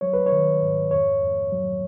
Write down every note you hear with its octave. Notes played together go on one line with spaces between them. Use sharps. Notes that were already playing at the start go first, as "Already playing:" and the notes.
F#3 C#5
B4
C#5
D#3
G#2
F2 C#5
F2
F#3